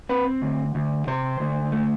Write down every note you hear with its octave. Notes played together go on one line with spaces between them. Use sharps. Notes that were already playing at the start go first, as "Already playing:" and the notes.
C4 B4
D2
D2
C3 C5
D2
A3